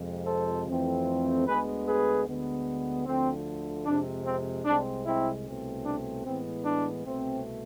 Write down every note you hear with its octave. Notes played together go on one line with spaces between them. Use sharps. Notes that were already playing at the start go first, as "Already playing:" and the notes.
Already playing: F2 C3 F3 G#3
A4 C5
F2 E3 A3 C4
D2 D3 G#3 B3 G#4 B4
G#4 B4
D2 D3 G#3 B3
D2 D3 F3 A3 C4
F2 C3 G#3 C4 D4
C4
C2 C3 G#3 C4 D4
C4 E4
C2 B2 A3 C4
D4
A2 E3 G#3 B3 C4
D4
C2 B2 A3 C4